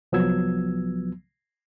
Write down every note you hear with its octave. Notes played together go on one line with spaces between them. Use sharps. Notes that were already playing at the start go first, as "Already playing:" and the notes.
C2 F3 F#3 B3 E6 G#6